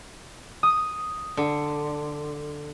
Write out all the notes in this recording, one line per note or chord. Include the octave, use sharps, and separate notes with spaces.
D#6
D3